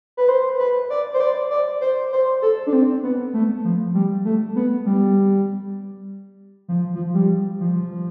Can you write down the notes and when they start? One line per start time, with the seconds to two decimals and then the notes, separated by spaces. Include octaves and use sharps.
0.17 B4
0.29 C5
0.59 B4
0.90 D5
1.14 C5
1.20 D5
1.50 D5
1.81 C5
2.12 C5
2.42 A4
2.67 D4
2.73 C4
3.03 B3
3.34 A3
3.64 F3
3.94 G3
4.25 A3
4.56 B3
4.86 G3
6.68 F3
6.95 F3
7.14 G3
7.60 F3